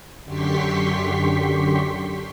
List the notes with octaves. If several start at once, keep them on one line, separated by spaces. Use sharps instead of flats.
F#2 D3 G4 C6 C#6 B6